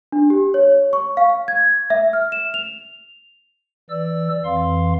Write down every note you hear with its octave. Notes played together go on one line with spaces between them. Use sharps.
D4
G4
C#5
C#6
F5
G#6
E5
F6
E7
F7
E3 D5 E6
F2 E3 F5 C6